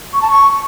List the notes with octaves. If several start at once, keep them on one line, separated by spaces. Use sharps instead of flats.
C#6
A5
C#6